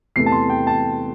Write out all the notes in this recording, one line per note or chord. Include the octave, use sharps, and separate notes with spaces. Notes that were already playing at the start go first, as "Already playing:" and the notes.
E2 C3 E3 A3 C7
A5
C6
G5
A5